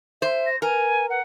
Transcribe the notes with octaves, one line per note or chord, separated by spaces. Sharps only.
C5 E5
A#6
A#4 B4 G#5
F#5